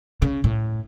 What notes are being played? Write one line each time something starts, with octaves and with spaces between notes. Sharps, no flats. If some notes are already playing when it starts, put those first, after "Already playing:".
C#3
A2